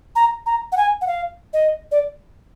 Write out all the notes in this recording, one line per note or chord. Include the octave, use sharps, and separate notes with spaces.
A#5
A#5
F#5
G#5
F#5
F5
D#5
D5